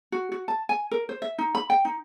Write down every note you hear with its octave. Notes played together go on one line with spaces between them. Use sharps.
F#4
F#4
A5
G#5
A#4
C5
E5
D#4
B5
G5
D#4